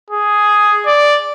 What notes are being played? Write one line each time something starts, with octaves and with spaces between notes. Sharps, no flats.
G#4
D5